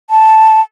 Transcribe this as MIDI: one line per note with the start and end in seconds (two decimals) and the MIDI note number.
0.10 0.61 81